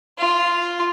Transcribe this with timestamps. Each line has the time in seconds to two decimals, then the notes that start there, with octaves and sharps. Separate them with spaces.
0.18 F4